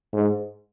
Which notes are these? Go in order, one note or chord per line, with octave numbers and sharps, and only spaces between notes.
G#2